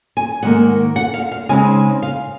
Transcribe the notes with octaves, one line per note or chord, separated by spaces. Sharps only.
G#5
G#2 D#3 A#3 F#5
F#5
F5
F5
C#3 G#3 C4 D#4 G#5
F5